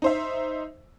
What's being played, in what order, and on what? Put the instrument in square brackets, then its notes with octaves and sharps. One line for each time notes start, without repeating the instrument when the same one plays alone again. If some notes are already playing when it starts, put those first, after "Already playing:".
[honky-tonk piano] D#4 C5 E5